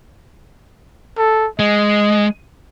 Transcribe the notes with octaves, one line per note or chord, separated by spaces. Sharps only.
A4
G#3 D#5